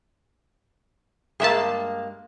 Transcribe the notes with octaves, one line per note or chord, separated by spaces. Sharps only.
G2 G#3 A#3 G#4 E5 A5